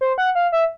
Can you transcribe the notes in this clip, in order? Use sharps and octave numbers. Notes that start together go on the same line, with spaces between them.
C5
F#5
F5
E5